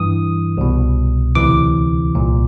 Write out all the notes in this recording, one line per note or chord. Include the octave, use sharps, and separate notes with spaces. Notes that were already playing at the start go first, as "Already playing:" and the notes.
Already playing: G2 E3 D#6
C2 B2
D2 C3 E3 D6
C2 A#2